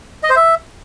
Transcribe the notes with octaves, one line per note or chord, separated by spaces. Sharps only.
D#5
C5
E5